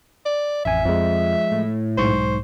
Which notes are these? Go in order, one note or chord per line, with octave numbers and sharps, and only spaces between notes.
D5
A1 F2 E5 G#5
F2 F3 G#3
A2
B1 G#2 C5 C#6